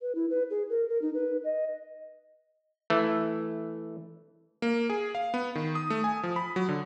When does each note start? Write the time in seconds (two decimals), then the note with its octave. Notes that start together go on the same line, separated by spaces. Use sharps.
0.02 B4
0.15 E4
0.30 B4
0.50 G#4
0.70 A#4
0.89 A#4
1.02 D#4
1.14 B4
1.44 D#5
2.90 E3 A3
4.62 A#3
4.90 G#4
5.15 F5
5.34 B3
5.55 D#3
5.75 D#6
5.90 A3
6.04 G#5
6.23 F3
6.36 B5
6.56 F#3
6.69 D3